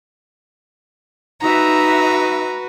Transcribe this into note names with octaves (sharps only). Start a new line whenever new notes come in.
D#4 F#4 B4 E5 A#5